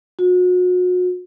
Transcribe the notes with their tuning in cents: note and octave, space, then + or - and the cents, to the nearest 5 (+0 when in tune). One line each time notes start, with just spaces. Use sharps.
F#4 -35